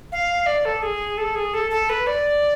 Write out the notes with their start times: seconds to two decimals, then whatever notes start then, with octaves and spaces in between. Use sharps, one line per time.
0.12 F5
0.46 D5
0.65 A4
0.83 G#4
1.18 A4
1.35 G#4
1.54 A4
1.71 A4
1.89 B4
2.07 D5